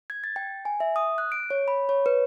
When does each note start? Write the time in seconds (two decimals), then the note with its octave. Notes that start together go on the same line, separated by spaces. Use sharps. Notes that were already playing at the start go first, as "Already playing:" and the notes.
0.10 G#6
0.24 A6
0.36 G5
0.65 G#5
0.80 E5
0.96 D#6
1.18 F#6
1.32 D7
1.50 C#5
1.68 B5
1.89 C#5
2.06 B4